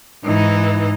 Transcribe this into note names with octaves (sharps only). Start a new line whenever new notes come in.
G#2 E3 D#4